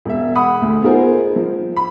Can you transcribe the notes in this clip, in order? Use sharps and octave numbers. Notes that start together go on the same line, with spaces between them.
E1 E5
F#5 B5 D#6
D2
B3 D#4 F4 G#4 A#4 C5
F3
B5